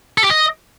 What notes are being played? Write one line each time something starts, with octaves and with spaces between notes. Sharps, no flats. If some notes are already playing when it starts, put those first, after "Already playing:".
A4
G4
D#5